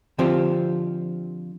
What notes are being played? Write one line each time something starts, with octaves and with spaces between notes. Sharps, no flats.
D3 F3 C4 F4 G4 C5